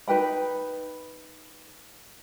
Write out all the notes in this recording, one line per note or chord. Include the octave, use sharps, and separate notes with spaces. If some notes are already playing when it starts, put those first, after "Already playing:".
D#4 B4 G5 B5